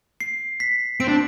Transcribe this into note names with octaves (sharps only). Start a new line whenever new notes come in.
C7
B6
C4 D7
D4